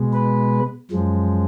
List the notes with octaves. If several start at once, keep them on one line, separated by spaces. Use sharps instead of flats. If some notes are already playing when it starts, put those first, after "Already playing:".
Already playing: B2 G#3
B4
F#2 F3 G#3